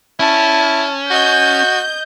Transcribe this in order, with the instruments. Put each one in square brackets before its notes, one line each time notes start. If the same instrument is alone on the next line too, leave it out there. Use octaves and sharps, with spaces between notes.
[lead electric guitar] C#4 [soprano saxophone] E4 [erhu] A5
[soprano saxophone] F#4 [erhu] D#5 [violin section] G6